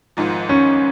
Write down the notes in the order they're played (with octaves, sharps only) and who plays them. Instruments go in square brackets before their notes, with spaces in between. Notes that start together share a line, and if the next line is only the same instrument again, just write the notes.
[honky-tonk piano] G#1 G#2 F3
[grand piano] C#4